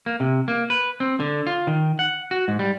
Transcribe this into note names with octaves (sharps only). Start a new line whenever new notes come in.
A#3
C3
A#3
B4
C4
D3
F4
D#3
F#5
F#4
G#2
G3